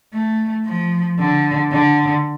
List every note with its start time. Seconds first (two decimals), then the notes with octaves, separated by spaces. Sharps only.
0.13 A3
0.66 F3
1.19 D3
1.72 D3